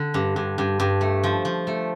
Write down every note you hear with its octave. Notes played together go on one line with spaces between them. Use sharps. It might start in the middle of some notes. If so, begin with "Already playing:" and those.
Already playing: D3
G2
G2
G2
G2
A3
F3
F3
A3